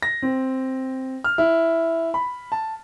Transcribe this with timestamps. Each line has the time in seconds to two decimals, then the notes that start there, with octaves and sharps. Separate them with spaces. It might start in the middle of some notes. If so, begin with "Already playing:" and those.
0.03 A#6
0.22 C4
1.24 F6
1.38 E4
2.14 B5
2.52 A5